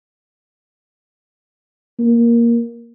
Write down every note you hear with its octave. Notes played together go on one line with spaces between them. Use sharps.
A#3